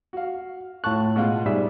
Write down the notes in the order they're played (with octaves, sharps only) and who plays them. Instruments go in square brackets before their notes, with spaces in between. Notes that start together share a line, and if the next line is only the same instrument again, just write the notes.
[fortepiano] F#4 F5
[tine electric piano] A2 F#6 [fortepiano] F4 A5 C#6
[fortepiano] B2 G#3 F4
[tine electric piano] G#2 G3 E5 [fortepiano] G#4